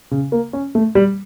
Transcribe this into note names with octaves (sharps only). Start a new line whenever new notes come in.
C#3
A#3
C#4
A3
G3